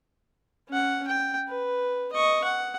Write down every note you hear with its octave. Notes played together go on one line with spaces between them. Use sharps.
C#4 F#5
G5
B4
D#5 C#6
F#5